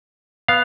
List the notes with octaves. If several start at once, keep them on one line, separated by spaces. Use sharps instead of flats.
B3 F5